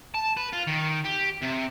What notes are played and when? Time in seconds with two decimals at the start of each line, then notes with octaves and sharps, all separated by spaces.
0.14 A5
0.37 B4
0.53 F4
0.67 D#3
1.04 G4
1.42 C3